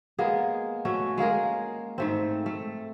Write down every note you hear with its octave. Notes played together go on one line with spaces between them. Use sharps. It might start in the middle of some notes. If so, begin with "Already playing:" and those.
G#3 A#3 B3 G#4
A3 C#4 F#4
G#3 A#3 G#4 A#4
G#2 A3 C4
A3